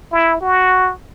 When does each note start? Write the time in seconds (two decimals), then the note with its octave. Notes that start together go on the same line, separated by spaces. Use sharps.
0.12 E4
0.41 F#4